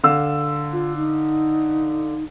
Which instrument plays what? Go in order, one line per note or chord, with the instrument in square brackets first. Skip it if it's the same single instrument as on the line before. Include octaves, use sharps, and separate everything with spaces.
[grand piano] D3 F5 E6
[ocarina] F4
D#4